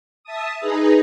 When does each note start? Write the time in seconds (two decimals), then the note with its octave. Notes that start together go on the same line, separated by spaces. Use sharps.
0.24 E5 A5 D#6
0.59 D#4 G#4 B4 A#5